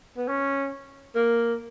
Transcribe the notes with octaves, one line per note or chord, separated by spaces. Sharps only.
B3
C#4
A#3